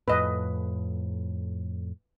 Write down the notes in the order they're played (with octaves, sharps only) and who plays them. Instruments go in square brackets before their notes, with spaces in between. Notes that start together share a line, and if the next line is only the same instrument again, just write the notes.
[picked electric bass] F2 A2 [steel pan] B4 D#5